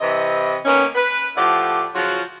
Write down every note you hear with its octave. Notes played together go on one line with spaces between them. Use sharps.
C3 E3 D#5
D#3 A#3 B3 C#4
B4
A2 F3 E4 G4 D5 F#5
C#3 F3 F#3 F4 F#4